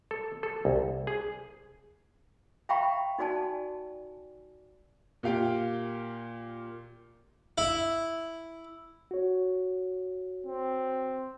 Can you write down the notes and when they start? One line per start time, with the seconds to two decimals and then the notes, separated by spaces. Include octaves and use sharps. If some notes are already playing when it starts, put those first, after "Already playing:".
0.11 A4
0.43 A4
0.65 C2
1.07 G#4
2.69 E5 F5 G5 A#5 B5 C#6
3.18 D#4 F#4 D5 G#5 A5
5.23 A#2 G4 F5 G5
7.58 E4
9.11 F#4 C#5
10.46 C4